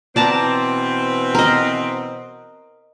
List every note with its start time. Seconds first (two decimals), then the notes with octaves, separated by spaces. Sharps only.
0.16 B2 E3 C4 D5 A5 A#5
1.35 A#4 D#5